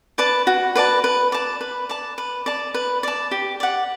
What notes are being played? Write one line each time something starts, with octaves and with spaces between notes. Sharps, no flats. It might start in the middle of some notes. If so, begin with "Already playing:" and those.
B4 D5 A5
F#4
B4 D5 A5
B4
D5 A5
B4
D5 A5
B4
D5 A5
B4
D5 A5
G4
D5 F#5